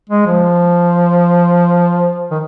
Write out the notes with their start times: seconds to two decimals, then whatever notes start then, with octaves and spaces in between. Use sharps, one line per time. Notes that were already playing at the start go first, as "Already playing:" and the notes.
0.10 G#3
0.27 F3
2.31 D#3